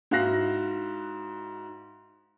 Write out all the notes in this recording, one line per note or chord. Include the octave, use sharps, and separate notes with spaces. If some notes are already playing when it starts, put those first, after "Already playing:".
G#2 E4 F#4 F5 F#6 A#6